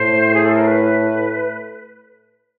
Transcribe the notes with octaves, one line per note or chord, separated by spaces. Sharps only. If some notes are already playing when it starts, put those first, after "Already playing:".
Already playing: A2 A3 C5
G#4
A4
A#4
B4